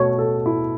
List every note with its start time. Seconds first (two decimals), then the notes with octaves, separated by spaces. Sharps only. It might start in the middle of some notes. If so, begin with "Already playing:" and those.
Already playing: B2 A3 C#5
0.19 A4
0.46 E4